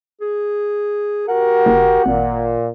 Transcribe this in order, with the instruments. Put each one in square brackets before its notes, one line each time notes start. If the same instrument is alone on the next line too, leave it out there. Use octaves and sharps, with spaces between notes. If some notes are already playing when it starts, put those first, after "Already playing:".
[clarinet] G#4
[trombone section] F#4 G4 A#4 [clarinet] F#5
[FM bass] F#1
[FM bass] G#1 [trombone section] A#2